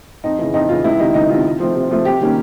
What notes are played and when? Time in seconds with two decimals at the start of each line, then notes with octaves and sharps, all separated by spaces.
0.24 F2 D#4
0.39 C#3 E3
0.54 F2 D#4
0.69 C#3 E3 F4
0.84 C#2 E4
0.99 C3 D#3 D#4
1.14 C#2 D#4
1.29 C3 D#3 F4
1.46 C3
1.60 F3 A3 C4
1.76 C3
1.91 F3 A3 C4
2.05 C3 G4
2.21 D#3 G3 A#3 C#4